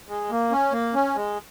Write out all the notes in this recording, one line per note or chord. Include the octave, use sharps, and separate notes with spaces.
G#3
A#3
C#4
A#3
C#4
G#3